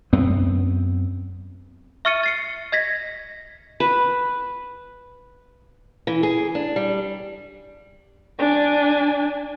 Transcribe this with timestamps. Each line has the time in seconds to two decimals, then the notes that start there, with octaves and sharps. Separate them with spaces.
0.13 F#2 B3 C4
2.05 E5 C#6 F6 A6 C#7 D#7
2.23 A6 C7 C#7
2.72 D#5 G#6 A#6 B6
3.80 B4
6.07 E3
6.23 G#4
6.55 D4
6.76 G3
8.38 D4 G#5